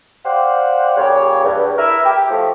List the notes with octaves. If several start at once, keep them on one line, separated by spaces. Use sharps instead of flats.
G4 C5 D5 F5 F#5
A#2 C#3 G4 C#5
E2 G2
E4 A#4 B4 E5
G4
F3 A3